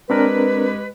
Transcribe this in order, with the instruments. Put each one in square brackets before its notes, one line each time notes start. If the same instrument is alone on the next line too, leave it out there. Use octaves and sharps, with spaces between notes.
[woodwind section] G#3 G4 B4 [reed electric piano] C4 D4 A#4